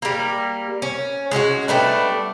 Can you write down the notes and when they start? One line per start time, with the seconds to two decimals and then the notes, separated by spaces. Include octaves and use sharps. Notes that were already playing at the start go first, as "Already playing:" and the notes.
0.02 G3 A#3
0.82 C#4
1.31 G#3 C#4 E4 F#4
1.68 G3 A3 B3 D4